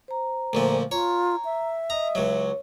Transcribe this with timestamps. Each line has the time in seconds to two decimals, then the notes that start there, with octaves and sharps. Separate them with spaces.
0.08 C5 A#5
0.53 D2 A#2 F3
0.91 F4 C#5 A#5
1.45 E5
1.90 D#5 A#5 D#6
2.15 C#2 F#3 C#5